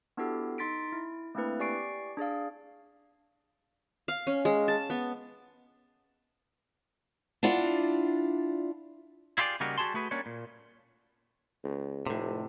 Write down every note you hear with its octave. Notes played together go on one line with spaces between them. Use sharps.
B3 D4 E4 F#4 G4 A4
D#4 C6 A6 B6 D7
E4
A3 A#3 C4 D4 E4 B4
G4 D5 G#5 C#6 C7 D7
D4 G#4 D5 F5
F5
C#4
G#3
A5
B3
D4 E4 F4 D5 F#5
E4 F4 G4 G#4 D5
C#3 G3 A#3 D#4 F#4 G4
G3 F#4 G#4 A5 C6
A3 F#4 G#4 B4
G3 A#3 C#4 D4 C#5
A#2
C#2
F1 A2 C3